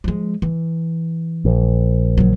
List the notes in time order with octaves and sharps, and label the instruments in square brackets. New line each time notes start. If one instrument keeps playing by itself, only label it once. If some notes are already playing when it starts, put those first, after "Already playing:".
[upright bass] F3 G#3
E3
[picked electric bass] A#1
[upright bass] D3 F#3